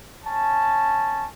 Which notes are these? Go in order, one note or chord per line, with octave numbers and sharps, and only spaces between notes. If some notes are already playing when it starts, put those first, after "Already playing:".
C#4 A5